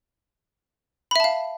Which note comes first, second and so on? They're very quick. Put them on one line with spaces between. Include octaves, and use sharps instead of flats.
B5 E5 A5 F5